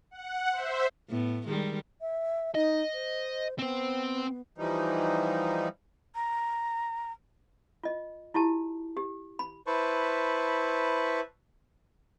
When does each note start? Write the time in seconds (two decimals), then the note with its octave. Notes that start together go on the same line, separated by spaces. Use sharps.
0.11 F#5
0.52 C5 E5
1.10 A2 B3
1.48 D#3 G3 G#3
2.01 E5
2.55 D#4 D#5
2.93 C5
3.59 B3 C4 C5
4.58 E3 F3 G3 D#4
6.15 A#5
7.83 F4 D#5
8.34 E4 F4 G4 A5
8.97 G4
9.39 B5
9.67 E4 B4 C5 A5 B5 C#6